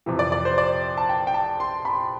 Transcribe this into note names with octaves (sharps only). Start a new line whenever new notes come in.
F2 C3 E3
D5
D5
C5
D5
A5
G5
G5
A5
C6
B5